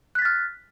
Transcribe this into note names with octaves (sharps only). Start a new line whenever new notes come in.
F6 F#6 A6 B6